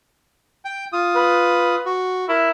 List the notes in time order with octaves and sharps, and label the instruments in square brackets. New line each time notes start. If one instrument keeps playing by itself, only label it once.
[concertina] G5
F4 D#6
[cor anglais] B4
[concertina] F#4
[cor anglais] E4 [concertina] A#4